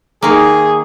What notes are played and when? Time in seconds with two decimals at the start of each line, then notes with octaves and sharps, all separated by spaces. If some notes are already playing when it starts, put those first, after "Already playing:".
0.23 D#3 A#3 G#4